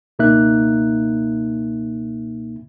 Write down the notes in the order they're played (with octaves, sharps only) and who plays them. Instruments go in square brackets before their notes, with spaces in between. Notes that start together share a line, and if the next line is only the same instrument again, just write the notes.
[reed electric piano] C#2 B2 A#3 D#4 E5 F#6